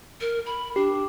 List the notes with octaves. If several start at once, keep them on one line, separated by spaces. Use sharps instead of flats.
A#4
B5
D4 G4